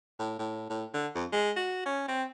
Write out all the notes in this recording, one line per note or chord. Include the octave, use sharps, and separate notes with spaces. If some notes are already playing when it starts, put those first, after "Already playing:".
A2
A2
A2
D3
F2
G#3
F#4
C#4
C4